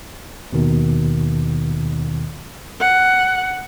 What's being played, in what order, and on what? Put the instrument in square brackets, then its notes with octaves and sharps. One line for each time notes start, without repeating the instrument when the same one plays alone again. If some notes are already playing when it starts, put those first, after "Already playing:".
[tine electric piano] D#2 B2 D#3
[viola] F#5